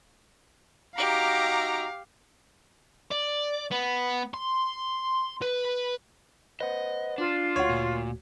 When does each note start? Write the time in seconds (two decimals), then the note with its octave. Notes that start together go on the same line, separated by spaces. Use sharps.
0.98 D#4 F#4 G4 F5 A#5 D6
3.11 D5
3.71 B3
4.34 C6
5.42 B4
6.60 B4 C5 D#5 F#5
7.18 D4 F4
7.56 D2 A3 F#4 C#5 F#5
7.69 A#2